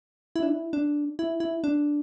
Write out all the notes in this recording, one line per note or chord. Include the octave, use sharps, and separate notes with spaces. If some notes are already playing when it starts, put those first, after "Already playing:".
E4
D4
E4
D4
E4
E4
D4